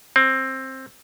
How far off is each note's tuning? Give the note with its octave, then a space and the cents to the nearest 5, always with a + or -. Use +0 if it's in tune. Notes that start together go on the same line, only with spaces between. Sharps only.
C4 +15